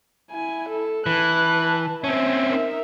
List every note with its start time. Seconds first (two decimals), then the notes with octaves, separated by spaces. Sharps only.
0.31 E4 G#5
0.69 A4
1.06 E3 B4 A5 F#6
2.04 C4 C#4 E5
2.49 D#4 A#4